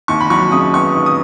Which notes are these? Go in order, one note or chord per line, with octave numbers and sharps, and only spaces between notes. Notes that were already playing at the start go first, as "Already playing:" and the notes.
D#2 C#6
B5
F#3 C#6
C#3 D#6
B3 C#6
D#2
D#6